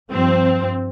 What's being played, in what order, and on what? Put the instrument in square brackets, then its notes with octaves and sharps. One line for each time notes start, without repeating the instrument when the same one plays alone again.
[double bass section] G2 F3 [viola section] C4